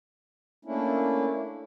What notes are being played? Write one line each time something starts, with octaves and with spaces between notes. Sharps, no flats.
A3 A#3 C#4 D4 E4